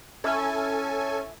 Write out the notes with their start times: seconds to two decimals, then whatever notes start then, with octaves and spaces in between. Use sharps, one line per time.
0.24 C#4 E4 A4 E5 G#5